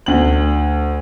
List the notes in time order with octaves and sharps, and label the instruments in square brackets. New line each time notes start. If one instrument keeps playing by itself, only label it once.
[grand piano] D2 F#7